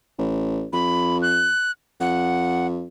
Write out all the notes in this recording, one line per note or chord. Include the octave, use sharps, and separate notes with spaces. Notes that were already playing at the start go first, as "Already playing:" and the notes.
A1
F2 B5
F#6
F2 F#5